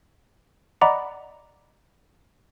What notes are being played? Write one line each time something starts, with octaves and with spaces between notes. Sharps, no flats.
D5 D#5 F#5 A#5 B5 D6